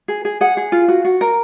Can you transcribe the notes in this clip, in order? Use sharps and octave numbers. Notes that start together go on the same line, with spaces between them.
G#4
G#4
G#4 F#5
G#4
F4
F#4
F#4
A#4